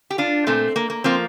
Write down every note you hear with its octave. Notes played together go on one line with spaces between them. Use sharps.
G4
D4 F4
A#2 A3 C4
A#3
A#3
F3 A#3 C4